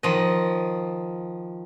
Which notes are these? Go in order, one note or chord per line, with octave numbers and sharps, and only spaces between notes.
D#3 F3 D#5